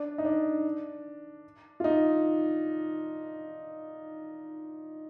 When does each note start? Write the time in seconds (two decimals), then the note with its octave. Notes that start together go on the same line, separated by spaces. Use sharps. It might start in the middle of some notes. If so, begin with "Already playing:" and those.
Already playing: D4
0.18 D#4
0.25 D4
1.80 F4
1.84 D#4